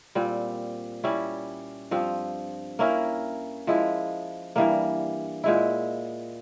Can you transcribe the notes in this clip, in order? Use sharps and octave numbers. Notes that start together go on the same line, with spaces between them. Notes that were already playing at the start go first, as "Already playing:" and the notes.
A#2 G3 C4
G3 C#4 E4
G2 F3 C4
A#3 C#4 E4 A#4
F3 G#3 E4
G2 E3 G3 A#3
A#2 G#3 E4